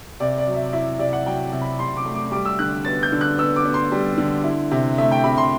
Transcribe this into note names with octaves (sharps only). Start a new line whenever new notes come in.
C3 D5
D5
F#3
E5
E4 E5
C3 D5
F#5
F#3 G5
C3
B5
C3 C6
D6
A3
D6
G3 D6
E6
D3 F#6
B3 A6
G6
D3
F#6
B3 E6
D6
B3
C6
G3
D3
E4
C3
A3 E5
G5
C3 B5
C6